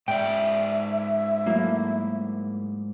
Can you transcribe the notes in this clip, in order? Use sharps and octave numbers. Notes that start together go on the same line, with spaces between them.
G#2 D5 E5 G5
F#3 A3 A#3 E4